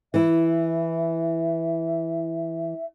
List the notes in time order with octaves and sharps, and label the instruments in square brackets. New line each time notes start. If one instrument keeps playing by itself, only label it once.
[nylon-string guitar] E3 E4 [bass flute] E5